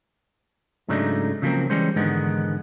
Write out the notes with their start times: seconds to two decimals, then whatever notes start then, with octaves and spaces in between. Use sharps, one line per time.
0.88 G#2 C#3 F#3 A3 D4 D#4
1.42 C#3 F3 F#3 A3 A#3 C4
1.70 E3 G3 G#3 C#4 C5
1.96 E2 G#2 D3 D#3 G#3 B3